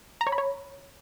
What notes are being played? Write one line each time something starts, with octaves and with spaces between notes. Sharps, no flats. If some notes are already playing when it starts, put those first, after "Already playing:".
A#5
C#5
B5
C#5